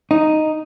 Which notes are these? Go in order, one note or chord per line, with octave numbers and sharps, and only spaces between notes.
D#4